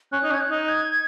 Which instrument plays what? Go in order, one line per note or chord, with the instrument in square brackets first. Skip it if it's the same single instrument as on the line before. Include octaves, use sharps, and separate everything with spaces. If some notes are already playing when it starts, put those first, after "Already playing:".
[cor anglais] C#4 [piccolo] F#6
[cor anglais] D#4
C#4
[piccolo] G#6
F#6
[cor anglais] D#4
[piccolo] G#6